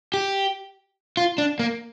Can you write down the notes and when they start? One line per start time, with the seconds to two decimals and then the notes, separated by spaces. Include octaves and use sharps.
0.14 G4
1.17 F4
1.38 D4
1.59 A#3